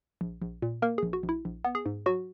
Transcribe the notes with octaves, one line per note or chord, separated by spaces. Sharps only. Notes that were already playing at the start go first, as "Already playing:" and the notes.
A#1
A#1
A#2
A#3 A#4
A#1 G#4
F#4
A#1
E4
A#1
B3
G#4
G#2
F#3 F#4